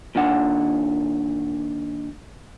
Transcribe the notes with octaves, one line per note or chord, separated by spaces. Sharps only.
A#2 D#3 D4 F#5